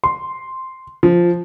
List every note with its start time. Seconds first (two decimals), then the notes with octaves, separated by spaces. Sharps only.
0.04 C6
1.03 F3